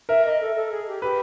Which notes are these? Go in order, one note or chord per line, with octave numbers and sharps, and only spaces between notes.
A#4 E5
D#5
A4
A4
G#4
G4
G4 B4